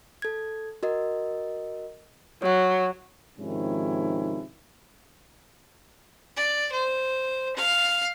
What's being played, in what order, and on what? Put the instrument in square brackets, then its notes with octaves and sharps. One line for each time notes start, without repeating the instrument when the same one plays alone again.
[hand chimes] A4 G#6
F#4 A#4 D#5
[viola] F#3 [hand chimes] C#5 F#5
[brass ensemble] G#2 C3 D#3 F3 C#4 E4
[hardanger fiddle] D5
C5
F5